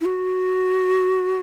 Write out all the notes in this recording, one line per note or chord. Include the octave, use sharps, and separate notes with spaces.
E4
F#4